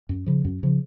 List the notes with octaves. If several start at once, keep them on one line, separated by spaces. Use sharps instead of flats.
F#2
C#3 F3
F#2
C#3 F3